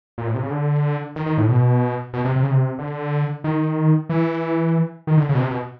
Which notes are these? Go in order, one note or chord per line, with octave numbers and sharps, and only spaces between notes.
A#2
A2
C3
C#3
D3
D#3
D#3
A2
B2
B2
C3
C3
C#3
C3
D3
D#3
E3
D#3
D3
C#3
B2
C3
B2